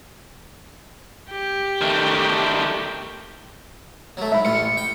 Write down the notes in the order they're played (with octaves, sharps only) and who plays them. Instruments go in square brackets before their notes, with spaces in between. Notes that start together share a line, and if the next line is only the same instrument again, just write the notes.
[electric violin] G4
[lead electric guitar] D#3 A3
[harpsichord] F#3 A3
[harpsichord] G#2 [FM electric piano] E5 B5
[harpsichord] A1 F4 [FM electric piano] C#7
[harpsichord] G5